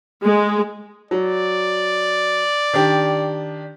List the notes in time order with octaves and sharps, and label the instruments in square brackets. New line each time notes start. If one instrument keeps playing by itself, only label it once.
[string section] G#3
[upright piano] F#3 [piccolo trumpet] D5
[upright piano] D#3 D4 G4